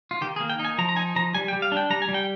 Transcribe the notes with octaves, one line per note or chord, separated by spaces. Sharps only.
F4
D#3 G4
G#4
A#3
G5
D#4
G#5
F3 A#5
A#5
D#4 G#5
F3 A#5
G3 G#5
G5
G3
F5
D4 G5
G3 A#5
G#5
G3
G5